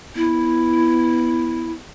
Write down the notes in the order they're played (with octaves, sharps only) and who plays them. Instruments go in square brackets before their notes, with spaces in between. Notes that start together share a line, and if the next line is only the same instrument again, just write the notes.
[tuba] B3 [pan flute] E4